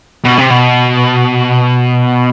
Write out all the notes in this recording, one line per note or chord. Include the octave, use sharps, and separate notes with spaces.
B2
C3
B2